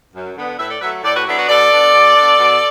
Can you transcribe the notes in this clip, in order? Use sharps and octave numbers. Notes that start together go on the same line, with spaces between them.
F#2
D3 B3
A2 B4 E5
A4 D5
F#3 A3 B4 E5
A2 A4 D5
F#4 B4
F#3 B3 D4 E4 A4
F#4 B4
B2 A4 D5
B3 D4
B2
B3 D4
B2